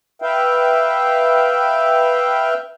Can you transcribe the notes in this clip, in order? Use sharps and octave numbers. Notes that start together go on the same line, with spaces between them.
B4 E5 F5 G5